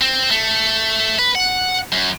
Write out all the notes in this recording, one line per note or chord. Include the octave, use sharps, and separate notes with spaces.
C4
A3
B4
F#5
F#2